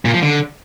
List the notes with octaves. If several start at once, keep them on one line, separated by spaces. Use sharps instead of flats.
A#2
F3
D3